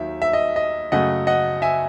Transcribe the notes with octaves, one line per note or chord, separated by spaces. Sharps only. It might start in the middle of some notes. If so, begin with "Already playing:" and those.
Already playing: D#2 D#3 F#3 E5
E5
D#5
D#5
F#2 C#3 F#3 A3 D#5 F#5
D#5 F#5
E5 G#5